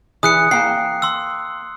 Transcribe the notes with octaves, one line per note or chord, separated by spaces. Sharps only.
E3 G#4 D#6 F#6 C#7
A#3 G5 C7
C6 E6